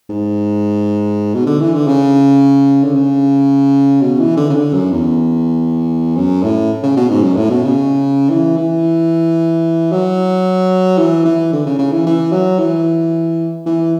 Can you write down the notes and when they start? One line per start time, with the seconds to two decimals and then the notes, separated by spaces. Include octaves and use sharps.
0.10 G#2
1.35 B2
1.47 D3
1.61 E3
1.74 D3
1.88 C#3
2.84 D3
2.95 C#3
4.02 B2
4.20 E3
4.37 D3
4.50 C#3
4.56 D3
4.74 F#2
4.92 E2
6.16 F#2
6.44 A2
6.83 C#3
6.97 B2
7.10 G#2
7.23 F#2
7.37 A2
7.50 B2
7.64 C#3
8.30 E3
8.58 E3
9.92 F#3
10.98 E3
11.25 E3
11.53 D3
11.66 C#3
11.79 C#3
11.93 E3
12.06 E3
12.32 F#3
12.59 E3
13.66 E3